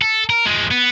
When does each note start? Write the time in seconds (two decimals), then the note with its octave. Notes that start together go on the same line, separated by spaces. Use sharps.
0.02 A4
0.30 A#4
0.46 F3 G#3
0.71 B3